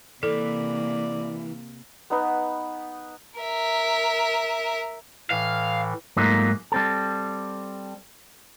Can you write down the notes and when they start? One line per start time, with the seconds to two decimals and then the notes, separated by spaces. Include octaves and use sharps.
0.23 C3 E3 A#3 A4 D5
2.10 B3 D#4 B4
3.39 A#4 E5
5.30 A2 E3 F5
6.17 G#2 F#3 A3 A#3 D#4 F4
6.72 G3 C4 A4